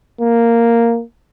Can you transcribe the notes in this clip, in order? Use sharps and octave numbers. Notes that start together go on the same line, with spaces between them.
A#3